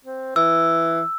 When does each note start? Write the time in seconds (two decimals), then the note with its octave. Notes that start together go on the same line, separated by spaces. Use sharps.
0.05 C4
0.36 E3 E6